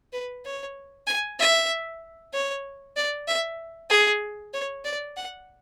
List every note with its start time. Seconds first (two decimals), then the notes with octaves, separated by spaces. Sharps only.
0.13 B4
0.45 C#5
1.07 G#5
1.40 E5
2.34 C#5
2.96 D5
3.28 E5
3.90 G#4
4.54 C#5
4.85 D5
5.17 F#5